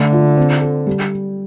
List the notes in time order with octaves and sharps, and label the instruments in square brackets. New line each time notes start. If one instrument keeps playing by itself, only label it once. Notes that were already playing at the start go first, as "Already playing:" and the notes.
Already playing: [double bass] D3 [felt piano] A3
[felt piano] F4
C4
A4
G3